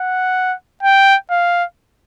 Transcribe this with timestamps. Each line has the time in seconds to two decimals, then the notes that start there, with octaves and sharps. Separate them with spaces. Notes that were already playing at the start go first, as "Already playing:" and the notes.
Already playing: F#5
0.83 G5
1.30 F5